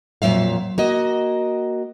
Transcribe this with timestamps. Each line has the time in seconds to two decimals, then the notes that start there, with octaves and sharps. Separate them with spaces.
0.22 F2 A#2 F#3 E5 F5
0.78 A#3 F#4 D#5